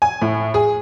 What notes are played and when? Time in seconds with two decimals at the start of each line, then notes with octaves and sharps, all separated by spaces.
0.02 G#5
0.22 A2
0.54 G#4